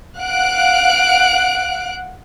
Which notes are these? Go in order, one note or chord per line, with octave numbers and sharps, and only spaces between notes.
F5 F#5 F#6 D7